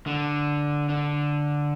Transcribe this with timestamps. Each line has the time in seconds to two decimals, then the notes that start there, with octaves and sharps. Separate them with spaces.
0.07 D3
0.89 D3